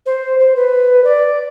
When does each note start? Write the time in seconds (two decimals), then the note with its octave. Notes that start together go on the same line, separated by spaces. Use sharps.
0.06 C5
0.40 C5
0.56 B4
1.04 D5